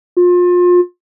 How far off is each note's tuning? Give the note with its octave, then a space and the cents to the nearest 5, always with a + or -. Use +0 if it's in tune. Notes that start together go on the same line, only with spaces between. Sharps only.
F4 +30